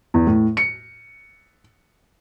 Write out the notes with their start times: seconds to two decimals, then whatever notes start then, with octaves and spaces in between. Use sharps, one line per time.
0.14 E2
0.27 A2
0.57 C#7